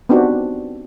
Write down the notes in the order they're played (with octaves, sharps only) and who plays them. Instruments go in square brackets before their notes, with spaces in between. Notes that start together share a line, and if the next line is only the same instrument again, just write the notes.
[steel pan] B3 C4 D4 D#4 F#4 G4